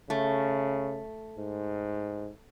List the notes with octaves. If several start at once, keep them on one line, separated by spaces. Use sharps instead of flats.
C#3 A3
G#2